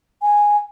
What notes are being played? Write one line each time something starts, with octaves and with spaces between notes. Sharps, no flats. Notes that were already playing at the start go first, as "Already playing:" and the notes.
G#5